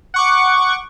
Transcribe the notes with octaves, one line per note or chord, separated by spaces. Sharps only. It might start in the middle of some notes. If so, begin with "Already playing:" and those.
F#5 C#6 D6